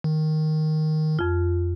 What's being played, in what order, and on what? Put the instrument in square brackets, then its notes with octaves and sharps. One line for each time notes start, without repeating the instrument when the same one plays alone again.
[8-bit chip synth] D#3
[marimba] F2 F4